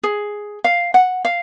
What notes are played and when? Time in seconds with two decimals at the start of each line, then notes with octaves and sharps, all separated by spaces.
0.04 G#4
0.64 F5
0.94 F#5
1.25 F5